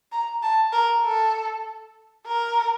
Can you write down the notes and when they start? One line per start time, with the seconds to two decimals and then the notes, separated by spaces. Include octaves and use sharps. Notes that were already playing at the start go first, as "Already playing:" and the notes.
0.12 A#5
0.43 A5
0.73 A#4
1.05 A4
2.27 A#4